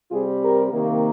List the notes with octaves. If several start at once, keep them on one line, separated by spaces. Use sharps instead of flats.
C3 G3 C4 F4 G#4
G4 A#4
C3 D#3 A#3